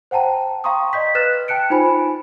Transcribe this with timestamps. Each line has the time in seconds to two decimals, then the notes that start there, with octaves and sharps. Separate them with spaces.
0.11 C5 F#5 G5 A5 A#5
0.64 F5 G5 A#5 C6 C#6 D#6
0.93 D5 D#5 G6 B6
1.15 B4 F6 F#6 A6 E7
1.48 G5 A5 F#6 C#7 D7
1.70 D#4 F4 C5 G#5 B5